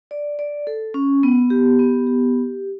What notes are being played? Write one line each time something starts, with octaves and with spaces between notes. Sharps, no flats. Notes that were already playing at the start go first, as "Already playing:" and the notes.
D5
D5
A4
C#4
B3
G4
B3
G4